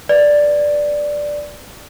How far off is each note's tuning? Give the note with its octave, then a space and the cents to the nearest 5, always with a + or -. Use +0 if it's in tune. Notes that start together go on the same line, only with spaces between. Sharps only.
B4 +0 D5 +0